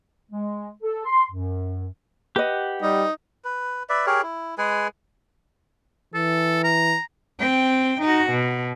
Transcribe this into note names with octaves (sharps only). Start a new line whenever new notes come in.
G#3
A4
C6
F#2
G4 B4 D#5 F#5
G3 D#4
B4
B4 D5 E5
G4 G#4 A#4 C#5
E4
G#3 G#4 B4 G#5
E3 A4
A#5
C4 G5
D#4 F#4
B2